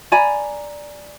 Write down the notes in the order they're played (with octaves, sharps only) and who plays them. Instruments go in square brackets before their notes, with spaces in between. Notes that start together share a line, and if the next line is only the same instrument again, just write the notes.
[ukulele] D5 G#5 A#5 B5